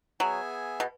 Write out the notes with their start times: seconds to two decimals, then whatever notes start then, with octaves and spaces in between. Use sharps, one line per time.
0.20 F#3 B3 G#4 E5 G#5
0.80 B2